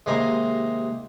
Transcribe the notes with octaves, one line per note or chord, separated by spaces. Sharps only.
D#2 C3 G#3 G#5 A#5 C6